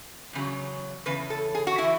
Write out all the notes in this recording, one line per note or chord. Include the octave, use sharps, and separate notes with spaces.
E2 C#3 F#3
E2 C#3 B4
A4
G#4
F#4
E3 E4